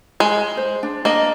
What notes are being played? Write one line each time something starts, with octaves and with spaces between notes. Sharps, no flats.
G#3
C5
D4
A#3 D4 D#5